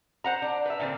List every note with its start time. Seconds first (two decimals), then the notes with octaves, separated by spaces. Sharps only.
0.24 C5 F#5 A#5
0.42 D4
0.66 B4 E5
0.80 A#2 D3 C4